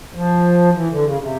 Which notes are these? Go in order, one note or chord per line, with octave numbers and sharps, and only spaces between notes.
F3
E3
D3
C#3
C3